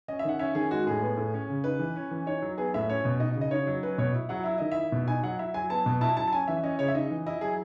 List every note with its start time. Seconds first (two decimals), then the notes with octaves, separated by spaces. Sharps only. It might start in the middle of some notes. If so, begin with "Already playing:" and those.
0.08 C#4 D#5
0.19 E5
0.25 D#3 F#5
0.39 C#4 E5
0.55 D#3 G#4
0.71 G#3 F#4
0.87 A2 G#4
1.02 B3
1.17 A2
1.34 C#4
1.49 C#3
1.64 D#4 B4
1.79 E3
1.96 C#4
2.11 E3
2.27 D#4 C#5
2.42 F#3
2.58 B3 G#4
2.74 A2 E5
2.90 C#4 C#5
3.05 B2
3.20 D#4 D#5
3.36 C#3
3.41 D#5
3.51 D#4 C#5
3.67 F#3
3.83 C#4 B4
3.98 B2 C#5
4.15 E4
4.29 F#3 F#5
4.44 E4 E5
4.58 D#3 D#5
4.72 E4 E5
4.92 B2
5.07 D#4 G#5
5.23 F#3 F#5
5.38 E4 E5
5.54 F#3 G#5
5.70 B3 A5
5.86 B2
6.01 E4 A5
6.17 F#3 A5
6.28 A5
6.33 C#4 G#5
6.48 E3 E5
6.63 C#4 D#5
6.79 C#3 C#5
6.88 E5
6.94 D#4 D#5
7.11 E3
7.26 E4 D#5
7.41 F#3 G#4